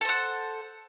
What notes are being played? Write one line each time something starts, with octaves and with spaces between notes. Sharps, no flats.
A4 C5 F#5